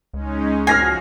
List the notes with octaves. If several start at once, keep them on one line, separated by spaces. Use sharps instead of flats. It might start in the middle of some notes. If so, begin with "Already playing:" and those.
C#2 G#3 C#4 D#4
F3 F#4 G#5 F6 A#6 C7